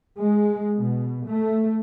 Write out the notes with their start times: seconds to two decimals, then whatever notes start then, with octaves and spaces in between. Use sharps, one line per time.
0.17 G#3
0.77 B2
1.27 A3